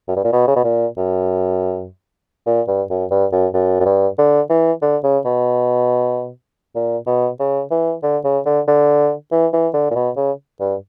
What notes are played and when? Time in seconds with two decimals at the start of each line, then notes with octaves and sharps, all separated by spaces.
0.08 F#2
0.16 G2
0.24 A#2
0.33 B2
0.48 C#3
0.56 B2
0.64 A#2
0.97 F#2
2.46 A#2
2.68 G2
2.90 F#2
3.11 G2
3.32 F#2
3.54 F#2
3.80 F#2
3.85 G2
4.18 D3
4.50 E3
4.82 D3
5.04 C#3
5.25 B2
6.75 A#2
7.06 B2
7.39 C#3
7.71 E3
8.03 D3
8.24 C#3
8.46 D3
8.68 D3
9.32 E3
9.53 E3
9.74 D3
9.91 A#2
9.95 B2
10.17 C#3
10.60 G2